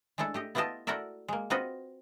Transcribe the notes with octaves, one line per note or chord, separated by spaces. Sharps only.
G#3 A3 D4 E4 A4
A3 G4 D#5
B3 E4 F4 G4 D#5 A5
A3 E4 F#4 A#4 D5 E5
G#3 A#3
C4 F4 F#4 B4 D#5